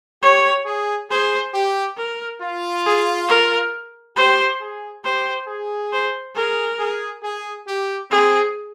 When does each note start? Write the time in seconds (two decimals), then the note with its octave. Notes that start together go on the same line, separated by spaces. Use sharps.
0.23 G4 C#5
0.66 G#4
1.10 G#4 C5
1.54 G4
1.97 A#4
2.42 F4
2.86 G#4
3.29 A#4
4.16 G4 C5
4.61 G#4
5.04 G4 C5
5.48 G#4
5.93 C5
6.36 G#4 A#4
6.79 G#4
7.23 G#4
7.67 G4
8.11 C4 G#4